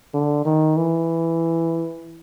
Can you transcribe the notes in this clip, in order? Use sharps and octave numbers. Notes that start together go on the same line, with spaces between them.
D3
D#3
E3